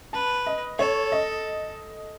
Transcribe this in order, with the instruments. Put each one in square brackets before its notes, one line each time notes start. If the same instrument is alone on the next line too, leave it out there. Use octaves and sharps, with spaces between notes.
[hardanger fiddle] B4 [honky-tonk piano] A5
[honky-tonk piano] D#5
[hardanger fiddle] A4 [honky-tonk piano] C#5
[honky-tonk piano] D#5